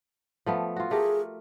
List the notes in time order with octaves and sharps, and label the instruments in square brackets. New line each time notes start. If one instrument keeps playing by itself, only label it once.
[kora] F3 A3 B3
F4 F#4
[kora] A3 G4 A#4 [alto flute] G#4